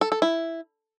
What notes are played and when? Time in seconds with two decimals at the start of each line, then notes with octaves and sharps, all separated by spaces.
0.01 A4
0.12 A4
0.22 E4